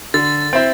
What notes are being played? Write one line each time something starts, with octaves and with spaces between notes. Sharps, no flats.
D3 A6
C4 E4 C5